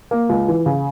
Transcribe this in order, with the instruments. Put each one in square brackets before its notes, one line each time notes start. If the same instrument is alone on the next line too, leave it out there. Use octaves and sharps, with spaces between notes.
[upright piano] A#3
C#2
E3
C#3